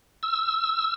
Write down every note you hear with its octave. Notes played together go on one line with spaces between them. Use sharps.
E6